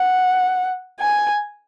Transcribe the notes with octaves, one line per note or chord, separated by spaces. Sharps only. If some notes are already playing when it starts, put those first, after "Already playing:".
Already playing: F#5
G#5